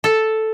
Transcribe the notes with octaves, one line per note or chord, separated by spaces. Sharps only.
A4